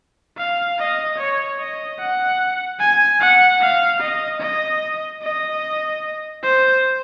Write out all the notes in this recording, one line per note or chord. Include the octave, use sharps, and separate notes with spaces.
F5
D#5
C#5
D#5
F#5
G#5
F#5
F5
D#5
D#5
D#5
C5